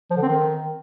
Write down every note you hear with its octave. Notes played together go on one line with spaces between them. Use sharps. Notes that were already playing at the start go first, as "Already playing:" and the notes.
F3
D3
C4
D#3